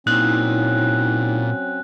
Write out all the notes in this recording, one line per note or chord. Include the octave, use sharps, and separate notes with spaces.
A#2 F#3 C4 C#4 D#4 E4 F#6